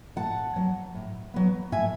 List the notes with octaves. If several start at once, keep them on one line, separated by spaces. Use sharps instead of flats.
A2 F#5 A5
F#3 B3
A2
F#3 B3
A2 E5 G#5